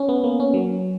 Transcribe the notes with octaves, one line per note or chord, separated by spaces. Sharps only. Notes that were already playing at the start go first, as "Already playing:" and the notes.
Already playing: C#4
B3
A#3
C#4
F#3